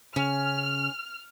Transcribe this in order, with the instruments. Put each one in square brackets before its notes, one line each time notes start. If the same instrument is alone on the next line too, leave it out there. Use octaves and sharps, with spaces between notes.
[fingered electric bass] C#3 [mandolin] C#4 [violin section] F6